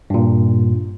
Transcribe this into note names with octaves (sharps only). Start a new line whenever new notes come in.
G2 A#2